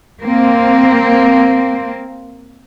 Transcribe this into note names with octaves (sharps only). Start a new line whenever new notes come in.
A#3 C4